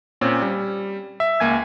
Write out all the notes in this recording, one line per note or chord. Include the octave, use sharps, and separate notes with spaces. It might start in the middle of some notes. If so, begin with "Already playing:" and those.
A#2 C4 C#4
G3
E5
C#2 A#3 G#5 G#6